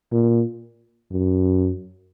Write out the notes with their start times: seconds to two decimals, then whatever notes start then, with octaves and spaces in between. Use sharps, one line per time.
0.12 A#2
1.11 F#2